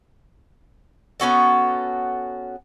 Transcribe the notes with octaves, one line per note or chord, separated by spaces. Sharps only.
B3 C#4 F#4 A4